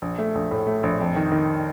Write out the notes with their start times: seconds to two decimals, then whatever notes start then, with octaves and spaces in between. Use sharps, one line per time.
0.02 A#1
0.18 A3
0.35 A#1
0.51 A2
0.67 A3
0.83 A#1
1.00 F2
1.16 D#3
1.32 D#3